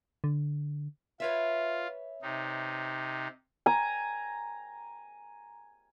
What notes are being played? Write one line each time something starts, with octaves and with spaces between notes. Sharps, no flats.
D3
F4 B4 C#5 E5
C3 D#4
G#5 A#5